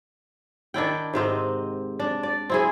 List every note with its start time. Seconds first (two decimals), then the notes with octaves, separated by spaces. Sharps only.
0.74 D#3 D4 E4 G5
1.13 G#2 C3 C4 D#4
2.00 D4
2.23 D5
2.50 C4 E4 G#4